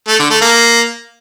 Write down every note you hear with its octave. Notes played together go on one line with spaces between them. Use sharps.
A3
D3
A3
A#3